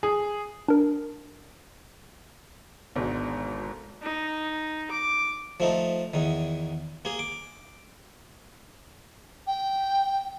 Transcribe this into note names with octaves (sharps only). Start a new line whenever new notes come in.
G#4
D4 A#4
G#1 G#2 B2 D3
D#4
D6
F3 A3 D#4
E2 D#3
A#3 G#4
D6
G5